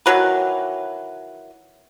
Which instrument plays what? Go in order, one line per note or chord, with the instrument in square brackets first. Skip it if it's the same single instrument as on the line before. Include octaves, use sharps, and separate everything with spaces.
[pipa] D#3 E3 F#3 B4